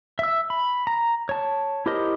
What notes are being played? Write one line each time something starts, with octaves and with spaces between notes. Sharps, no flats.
E5 E6
B5
A#5
C#5 A5
E4 G4 A#4 C5 D#5